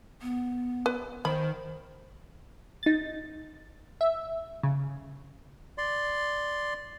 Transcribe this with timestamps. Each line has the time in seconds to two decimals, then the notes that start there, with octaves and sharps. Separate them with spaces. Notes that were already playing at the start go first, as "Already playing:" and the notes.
0.22 B3
0.86 B4
1.25 D#3 C5 B5
2.83 D#4 A6
4.01 E5
4.63 C#3
5.78 D5 C6